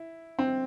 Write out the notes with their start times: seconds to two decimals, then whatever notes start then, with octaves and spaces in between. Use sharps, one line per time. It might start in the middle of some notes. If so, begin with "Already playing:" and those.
Already playing: E4
0.39 C4